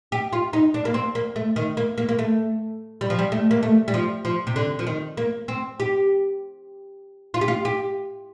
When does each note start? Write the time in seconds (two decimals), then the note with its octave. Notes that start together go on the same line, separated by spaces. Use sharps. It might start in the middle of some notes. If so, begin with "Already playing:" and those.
0.12 G4
0.33 F4
0.53 D#4
0.74 D4
0.85 A#3
0.94 C4
1.15 A#3
1.36 A3
1.56 D#3
1.77 A#3
1.98 A#3
2.09 A#3
2.19 A3
3.01 G3
3.10 F3
3.19 G3
3.32 A3
3.51 A#3
3.63 A3
3.88 G3
3.94 F3
4.25 F3
4.47 C3
4.56 D3
4.79 F3
4.87 D#3
5.17 A#3
5.48 C4
5.80 G4
7.34 F4
7.41 G4
7.48 F4
7.65 G4